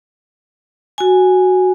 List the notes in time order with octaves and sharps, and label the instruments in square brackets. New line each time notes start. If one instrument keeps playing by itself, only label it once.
[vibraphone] F#4 G#5